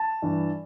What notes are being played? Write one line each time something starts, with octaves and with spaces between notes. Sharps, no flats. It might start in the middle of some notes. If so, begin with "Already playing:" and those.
Already playing: A5
G2 E3